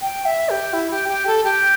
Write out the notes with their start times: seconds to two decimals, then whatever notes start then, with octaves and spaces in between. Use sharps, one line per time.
0.01 G5
0.25 E5
0.50 G4
0.73 E4
0.91 G4
1.09 G4
1.27 A4
1.44 G4